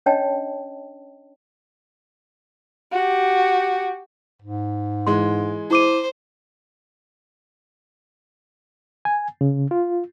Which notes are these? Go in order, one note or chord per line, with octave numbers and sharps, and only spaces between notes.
C#4 D4 C#5 D#5 G5 A5
F#4 G4
G#2
E3 G#3 C6
E4 C5 D6 D#7
G#5
C#3
F4